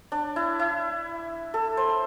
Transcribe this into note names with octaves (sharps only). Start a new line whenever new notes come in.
D4
E4
E4
A4
C5